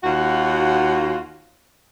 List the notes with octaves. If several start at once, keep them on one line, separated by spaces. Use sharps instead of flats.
D#2 F4 F#4